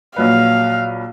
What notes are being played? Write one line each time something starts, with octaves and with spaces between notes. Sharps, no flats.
A#1 F#3 B4 F5